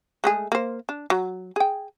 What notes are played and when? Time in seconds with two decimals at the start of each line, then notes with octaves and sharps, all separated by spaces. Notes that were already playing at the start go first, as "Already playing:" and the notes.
0.24 G#3 A3 G#4
0.52 A#3 C5
0.89 D4
1.10 F#3
1.56 G#4 G5